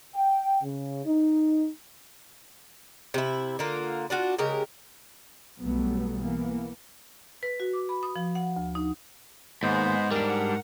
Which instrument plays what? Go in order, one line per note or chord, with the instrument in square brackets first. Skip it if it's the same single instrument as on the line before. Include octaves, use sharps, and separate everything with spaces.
[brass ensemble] G5
C#3
D#4
[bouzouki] C3 E4
D3 A#3 F4
D4 F4 F#4
C#3 G#3 G4 A#4
[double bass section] B1 F#3 G3 A3 B3
E3 A#3 B3
[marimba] B4
F#4
D6
B5
D#6
F3
F#5
D2
D#4
[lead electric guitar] D#2 [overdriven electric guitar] G#2 [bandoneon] G#3 B3 C5
[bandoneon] E2 [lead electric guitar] G3 D4 [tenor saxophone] A#4
[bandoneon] F#5